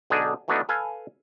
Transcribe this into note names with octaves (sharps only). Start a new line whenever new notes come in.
B1 D3 D4 D#4 G#4
E3 F#3 A3 B3 D4 D#4
A4 B4 F5 G#5